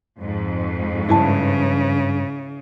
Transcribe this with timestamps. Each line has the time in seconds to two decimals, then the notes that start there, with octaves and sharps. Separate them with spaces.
0.19 F2 G#2
1.09 G2 C#3 E4 B4 A5